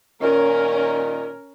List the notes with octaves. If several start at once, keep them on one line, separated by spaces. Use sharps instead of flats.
A#2 D#3 C#4 A#4